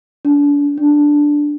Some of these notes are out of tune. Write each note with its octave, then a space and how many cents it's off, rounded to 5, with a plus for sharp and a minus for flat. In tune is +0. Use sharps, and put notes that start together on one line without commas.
D4 -35
D4 +0